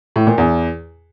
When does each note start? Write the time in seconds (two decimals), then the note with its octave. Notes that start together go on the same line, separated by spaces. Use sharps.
0.16 A2
0.27 A#2
0.38 E2